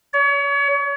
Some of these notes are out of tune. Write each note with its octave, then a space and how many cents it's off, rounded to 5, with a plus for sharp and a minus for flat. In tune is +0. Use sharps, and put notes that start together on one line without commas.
C#5 +35